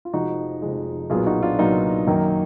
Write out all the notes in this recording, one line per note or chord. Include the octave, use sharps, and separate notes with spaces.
F4
F1 F2 F3 G#3 D#4 F#4
F1 F2 F3 G#3
B1 A#2 F#3 B3 F4 G#4
D#4 F#4
D4 F4
B1 A#2 F#3 B3 D#4
F#2 D#3 F#3 A#3